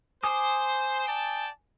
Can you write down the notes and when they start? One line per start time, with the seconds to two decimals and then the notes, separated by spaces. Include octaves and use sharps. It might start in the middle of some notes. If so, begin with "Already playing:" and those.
0.23 C5 G#5 D6 D#6
1.07 D5 G5 A5